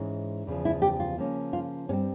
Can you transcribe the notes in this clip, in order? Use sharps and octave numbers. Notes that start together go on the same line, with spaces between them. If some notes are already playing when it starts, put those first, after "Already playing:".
Already playing: G#2 E3 G#3 C#4
E2 C#3 F3
E4
G4
F4
C#3 F3 A#3 C#4
F4
G2 G3 C4 C#4